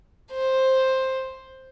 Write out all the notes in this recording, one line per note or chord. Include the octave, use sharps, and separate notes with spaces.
C5